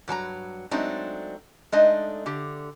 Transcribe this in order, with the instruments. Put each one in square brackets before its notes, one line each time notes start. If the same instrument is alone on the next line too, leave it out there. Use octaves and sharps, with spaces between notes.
[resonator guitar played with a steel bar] G2 F#3 A5 A#5
F#3 G#3 A3 C4 D4 D#4
G#3 A3 D4 D#4 D#5
D3 G4